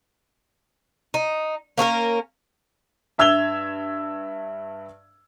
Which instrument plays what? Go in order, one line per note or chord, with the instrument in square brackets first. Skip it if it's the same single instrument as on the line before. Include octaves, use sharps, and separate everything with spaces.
[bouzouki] D#4
A#3 C#4 A4 A#4
[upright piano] G2 E5 E6 G#6 F7 G7